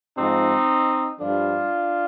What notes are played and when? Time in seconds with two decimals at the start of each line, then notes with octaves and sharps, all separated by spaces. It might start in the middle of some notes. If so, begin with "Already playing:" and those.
0.17 G#2 F3 C4 D#4
1.19 G2 F3 D4 F4